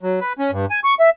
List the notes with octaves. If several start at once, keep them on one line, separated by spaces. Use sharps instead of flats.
F#3
B4
C#4
G2
G#5
C#6
E5